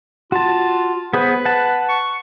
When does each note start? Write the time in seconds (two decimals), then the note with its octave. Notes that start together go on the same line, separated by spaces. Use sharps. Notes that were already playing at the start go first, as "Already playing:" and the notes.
0.32 F4 F#4 A5
1.13 B3 G#4 B4 C5
1.45 F#5 A5
1.89 C#6